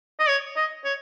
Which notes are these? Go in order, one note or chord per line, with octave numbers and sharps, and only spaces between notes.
D#5
C#5
D#5
C#5